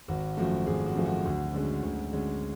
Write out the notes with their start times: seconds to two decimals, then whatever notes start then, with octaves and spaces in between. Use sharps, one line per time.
0.08 G#1 F#4
0.37 F#2 F3 A3 F#4
0.66 G#1 G#4
0.86 F#4
0.96 F#2 F3 A3
1.06 F#4
1.25 D2
1.54 D3 G#3 C#4
1.83 D2
2.13 D3 G#3 C#4